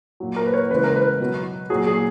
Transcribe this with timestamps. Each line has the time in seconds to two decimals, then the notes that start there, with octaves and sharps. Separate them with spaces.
0.20 A#2 F#3
0.36 A#4
0.47 B4
0.54 C#5
0.71 C#3 E3 G#3 B4
0.84 A#4
0.96 B4
1.20 B2 F#3
1.70 A#2 F#3 G#4
1.87 G#4